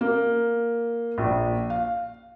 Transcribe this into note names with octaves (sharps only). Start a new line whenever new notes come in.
A#3
A#1
F5